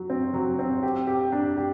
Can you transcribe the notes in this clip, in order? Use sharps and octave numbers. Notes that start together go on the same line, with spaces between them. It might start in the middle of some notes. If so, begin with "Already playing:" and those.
Already playing: F#3
C4
F#3
C4
G4
G4
D4
G4